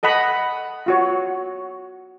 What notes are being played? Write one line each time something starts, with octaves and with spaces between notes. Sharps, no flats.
A4 D#5 F#5 B5
F4 F#4 C#5